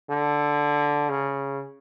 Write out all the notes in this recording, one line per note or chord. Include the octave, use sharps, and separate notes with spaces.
D3
C#3